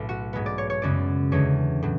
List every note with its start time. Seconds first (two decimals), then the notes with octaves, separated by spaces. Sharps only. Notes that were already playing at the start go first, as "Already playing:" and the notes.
Already playing: B1 A2
0.09 F#4
0.33 G#2 G#3 B3
0.46 D5
0.58 C#5
0.70 C#5
0.82 F#2 C#3 G#3 B3 D5
1.32 E2 D3 G#3 C#4 C#5
1.82 A2 F#3